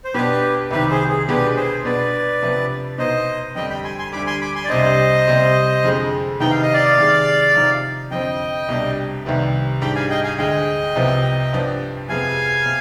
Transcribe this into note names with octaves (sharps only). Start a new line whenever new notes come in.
C5
B2 B3 D4 G4 B4
C2 C3 D#3 G4 B4
G#4 C5
G#4
B2 G#3 B3 D4 G4 B4
G#4 C5
B2 B3 D4 B4 D5
C3 F3 B3 D4
B2 B3 D#4 C5 D#5
F2 D3 G3 D4 D#5 G5
G5 B5
G#5 C6
G#5 C6
D2 D3 G3 B5 D6
G#5 C6
B5 D6
G#5 C6
D5
C2 C3 G3 D4 C5 D#5
C3 G3 C4
F2 D3 F3 G#3
C3 D#3 B3 D#4 G5
F5
D#5
D5 F5
C3 D#3 G#3
C3 F3 C4 D#4
F2 D3 F3 C4 D#5 G5
C2 B2 G3 D4
C2 C3 D#3 G3 B3
G#2 G3 D4 G5 B5
F5 G#5
D#5 G5
F5 G#5
D2 D3 G#3 D#5 G5
C2 C3 F3 B3
G2 F3 B3 D4
F2 C3 F3 G#3 B3 F5 G#5
C3